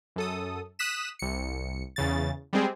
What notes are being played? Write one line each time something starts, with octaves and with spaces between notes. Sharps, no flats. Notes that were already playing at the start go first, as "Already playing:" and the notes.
F#2 A4 D#6
D#6 F#6 B6 E7
C2 C#7
E2 C#3 A6
G3 G#3 C4 G#4